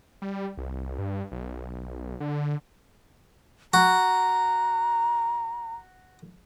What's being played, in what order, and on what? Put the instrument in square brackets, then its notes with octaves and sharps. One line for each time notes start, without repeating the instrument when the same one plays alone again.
[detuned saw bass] G3
C2
G2
B1
D3
[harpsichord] F#4 [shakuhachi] A#5